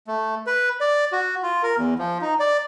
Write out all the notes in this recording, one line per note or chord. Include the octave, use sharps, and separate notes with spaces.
A3
B4
D5
F#4
F4
A#4
E2
F3
D#4
D5